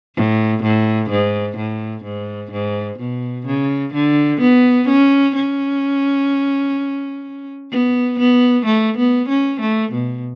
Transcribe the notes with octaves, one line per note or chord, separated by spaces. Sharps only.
A2
A2
G#2
A2
G#2
G#2
B2
C#3
D3
B3
C#4
C#4
B3
B3
A3
B3
C#4
A3
B2